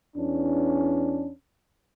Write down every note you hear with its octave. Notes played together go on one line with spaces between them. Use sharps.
E2 C#4 D4